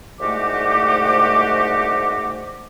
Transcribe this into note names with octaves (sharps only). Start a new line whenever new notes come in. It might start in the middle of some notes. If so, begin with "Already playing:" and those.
C2 G#2 A3 F#4 G4 D6